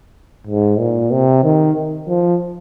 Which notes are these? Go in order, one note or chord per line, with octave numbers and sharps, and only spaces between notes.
G#2
A#2
C3
D#3
F3